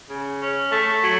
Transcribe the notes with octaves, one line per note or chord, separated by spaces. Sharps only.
C#3
C#4
A3
F#3